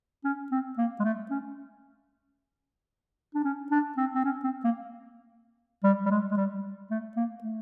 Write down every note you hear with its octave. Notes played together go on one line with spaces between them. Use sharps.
C#4
C4
A#3
G#3
A3
C#4
D4
C#4
D4
C4
C4
C#4
C4
A#3
G3
G3
G#3
G#3
G3
A3
A#3
A3